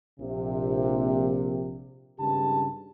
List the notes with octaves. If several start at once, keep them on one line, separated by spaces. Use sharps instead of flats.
A#1 C3
G#1 G2 C#3 G4 A5